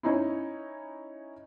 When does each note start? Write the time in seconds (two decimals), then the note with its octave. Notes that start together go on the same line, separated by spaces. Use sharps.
0.03 C#4 D#4 E4